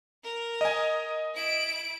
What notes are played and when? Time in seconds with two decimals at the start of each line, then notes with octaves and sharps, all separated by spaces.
0.24 A#4
0.61 D#5 G#5
1.35 E4 D7